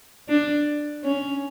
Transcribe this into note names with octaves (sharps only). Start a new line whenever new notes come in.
D4
C#4